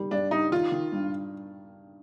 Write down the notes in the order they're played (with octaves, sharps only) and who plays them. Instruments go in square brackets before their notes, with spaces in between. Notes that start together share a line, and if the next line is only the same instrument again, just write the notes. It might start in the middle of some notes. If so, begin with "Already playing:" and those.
Already playing: [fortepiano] D#3 G3
[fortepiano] G2 [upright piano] D4
[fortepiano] G3 [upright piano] D#4
[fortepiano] D#3 [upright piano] F4
[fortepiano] D#3
G2